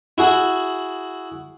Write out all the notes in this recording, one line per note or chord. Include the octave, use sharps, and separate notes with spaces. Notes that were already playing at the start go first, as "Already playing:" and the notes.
E4 F#4 G#4